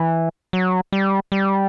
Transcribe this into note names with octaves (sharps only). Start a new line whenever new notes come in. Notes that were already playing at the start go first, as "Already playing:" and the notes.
Already playing: E3
F#3
G3
G3